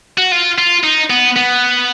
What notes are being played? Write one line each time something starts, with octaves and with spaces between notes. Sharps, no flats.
F#4
F4
F4
D#4
B3
B3